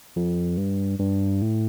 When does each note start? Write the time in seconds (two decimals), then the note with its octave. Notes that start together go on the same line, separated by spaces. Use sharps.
0.16 F2
0.57 G2
0.99 G2
1.42 A2